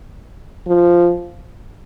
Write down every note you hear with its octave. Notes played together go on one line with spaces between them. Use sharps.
F3